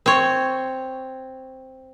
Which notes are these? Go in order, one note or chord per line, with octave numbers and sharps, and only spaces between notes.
C4 C#5